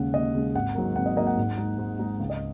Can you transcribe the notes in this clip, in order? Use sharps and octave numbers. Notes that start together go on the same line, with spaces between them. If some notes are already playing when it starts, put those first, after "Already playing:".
Already playing: D#2 C#3 G#3 F#5
D#2 D#5
C#3 G#3
G#1 F#5
G#2 F#3 A#3
G#1 F#5
D#5
G#2 F#3 A#3 D#5
F#5
G#2
G#3 D#4
G#2
G#3 D#4
C#2
D#5